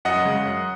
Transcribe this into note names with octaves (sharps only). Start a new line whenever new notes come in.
F#2 D#5 F#5
C#3 G#3
F#2